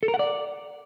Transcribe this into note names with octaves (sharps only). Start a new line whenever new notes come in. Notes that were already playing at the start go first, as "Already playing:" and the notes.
A4
A#4
F#5
D5